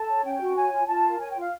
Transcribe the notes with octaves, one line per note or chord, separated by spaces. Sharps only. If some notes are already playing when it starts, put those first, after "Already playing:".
Already playing: A4 A5
C#5
C#4 G5
F#4
C#5 G#5
F4
F4 A5
A#4
C#5 G#5
G5
F4
F5